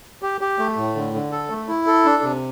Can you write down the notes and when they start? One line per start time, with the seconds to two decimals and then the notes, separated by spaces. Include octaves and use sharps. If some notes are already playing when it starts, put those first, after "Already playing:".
0.22 G4
0.41 G4
0.59 A3
0.77 A2
0.95 D3
1.14 D3
1.32 A4
1.50 A3
1.68 E4
1.87 A4
2.05 D4
2.23 C3